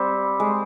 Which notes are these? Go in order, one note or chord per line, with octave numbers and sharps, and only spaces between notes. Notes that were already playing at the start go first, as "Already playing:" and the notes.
Already playing: G3 C4
G#3